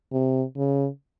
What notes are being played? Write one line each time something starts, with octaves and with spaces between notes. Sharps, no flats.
C3
C#3